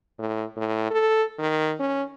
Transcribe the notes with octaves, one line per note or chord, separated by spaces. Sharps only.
A2
A2
A4
D#3
C#4